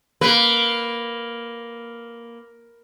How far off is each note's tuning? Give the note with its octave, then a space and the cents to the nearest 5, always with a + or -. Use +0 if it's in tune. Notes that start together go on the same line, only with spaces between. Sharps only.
A#3 +5 B4 +0